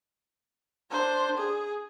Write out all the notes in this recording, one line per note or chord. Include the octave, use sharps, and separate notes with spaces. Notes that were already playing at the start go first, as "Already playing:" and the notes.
D4 C5
G#4